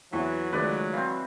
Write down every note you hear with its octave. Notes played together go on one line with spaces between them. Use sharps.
E2 E3 F#3 E4 F#5 C#6
C#2 D#3 G#3 A3 B4 D5
E3 C4 F5